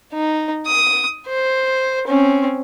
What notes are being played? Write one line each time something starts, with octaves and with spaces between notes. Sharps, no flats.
D#4
D#6
C5
C4 C#4